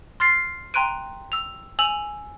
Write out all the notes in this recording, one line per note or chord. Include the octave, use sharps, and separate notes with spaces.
C6 F6 A6 C7
G5 A#5 C6 F#6 D7 D#7
E6 F7
G#5 E6 F7 F#7